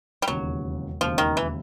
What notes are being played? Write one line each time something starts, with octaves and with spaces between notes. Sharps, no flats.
G3
E1 D#2 C#3 F#3
E1 D#2 C#3 F3
D#3
E3